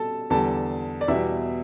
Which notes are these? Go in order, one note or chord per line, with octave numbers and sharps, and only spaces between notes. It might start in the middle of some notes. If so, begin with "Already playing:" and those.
Already playing: B2 G3 A4 A5
E2 D3 G3 A4 A5
D5
E2 B2 G3 E4 E5